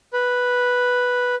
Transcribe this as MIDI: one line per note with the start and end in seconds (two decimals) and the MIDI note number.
0.13 1.35 71